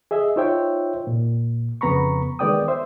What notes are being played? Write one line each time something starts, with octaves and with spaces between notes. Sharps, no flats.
G#4 D#5 E5
D#4 F4 C5 C#5 E5 G5
A#2
F2 C#3 B3 A#5 B5 C#6
D#3 G#3 B3 D5 G5 D#6
C5 E5